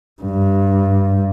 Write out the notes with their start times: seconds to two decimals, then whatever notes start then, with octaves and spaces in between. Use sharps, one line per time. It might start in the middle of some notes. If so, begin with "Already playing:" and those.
0.22 G2